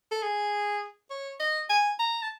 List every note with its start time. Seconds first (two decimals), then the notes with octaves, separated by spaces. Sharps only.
0.11 A4
0.23 G#4
1.10 C#5
1.40 D#5
1.70 G#5
1.99 A#5
2.22 A5